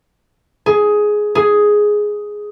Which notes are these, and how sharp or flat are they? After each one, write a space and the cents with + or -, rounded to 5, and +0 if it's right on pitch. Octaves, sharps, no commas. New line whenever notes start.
G#4 +10
G#4 +5